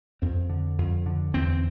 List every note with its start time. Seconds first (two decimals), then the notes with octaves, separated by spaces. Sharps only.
0.22 F2 C4
0.49 D3
0.78 F2
1.06 D3
1.34 E2 C4